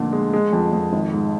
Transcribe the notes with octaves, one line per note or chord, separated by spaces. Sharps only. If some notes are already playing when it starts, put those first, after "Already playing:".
Already playing: F1 A#2 D3
G#3
G#3
F2
F2
G#1
G#2